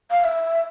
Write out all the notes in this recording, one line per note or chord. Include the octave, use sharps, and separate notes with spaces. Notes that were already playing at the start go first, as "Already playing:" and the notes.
F5
E5